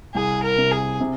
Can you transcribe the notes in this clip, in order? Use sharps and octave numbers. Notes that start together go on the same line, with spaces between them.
C2 G#4
A#4
C3
G#4
C3